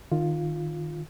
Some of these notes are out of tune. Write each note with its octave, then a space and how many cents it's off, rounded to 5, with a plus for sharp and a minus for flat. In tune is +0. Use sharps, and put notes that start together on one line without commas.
D#3 -20 F4 +0